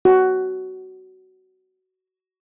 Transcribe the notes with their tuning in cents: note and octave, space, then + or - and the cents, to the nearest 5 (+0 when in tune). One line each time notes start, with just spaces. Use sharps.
F#4 +15